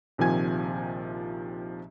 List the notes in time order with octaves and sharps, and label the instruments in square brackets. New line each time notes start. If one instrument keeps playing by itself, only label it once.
[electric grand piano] A#1 C3 D#3 F3 G#5 G#6